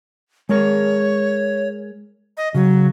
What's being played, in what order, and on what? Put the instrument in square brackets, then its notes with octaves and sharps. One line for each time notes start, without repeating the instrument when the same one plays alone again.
[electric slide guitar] G#3 G#4 A#4 [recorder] C#5
[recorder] D#5
[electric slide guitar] C#3 [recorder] F#3